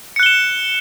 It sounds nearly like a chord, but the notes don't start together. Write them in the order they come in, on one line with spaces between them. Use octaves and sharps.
C#7 F#6 G7 E7